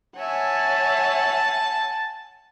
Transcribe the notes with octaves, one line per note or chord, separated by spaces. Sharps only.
C#5 E5 F#5 G#5 A5